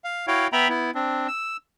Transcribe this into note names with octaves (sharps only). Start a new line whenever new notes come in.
F5
E4 F#4 C#5 F5 G5
B3 E5 G5 A#5 B5
B3 E4
C4 D4
E6